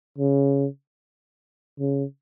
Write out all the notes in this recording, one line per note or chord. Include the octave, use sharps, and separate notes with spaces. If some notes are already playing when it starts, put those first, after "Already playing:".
C#3
C#3